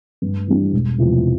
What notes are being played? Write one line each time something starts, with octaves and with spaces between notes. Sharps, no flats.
G2
E3 G3 D4
E1
E2 C3 F3